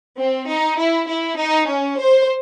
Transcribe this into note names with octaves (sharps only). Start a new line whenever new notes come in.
C4
D#4
E4
E4
D#4
C#4
C5